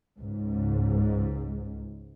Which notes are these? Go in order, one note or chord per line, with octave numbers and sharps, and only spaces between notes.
C#2 G#2